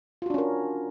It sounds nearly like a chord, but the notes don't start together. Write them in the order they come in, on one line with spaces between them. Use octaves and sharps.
F4 F#4 D4 C#4 A#4